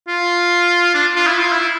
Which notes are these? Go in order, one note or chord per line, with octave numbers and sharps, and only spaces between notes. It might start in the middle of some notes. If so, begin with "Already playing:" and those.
F4
D4
F4
E4
F4
E4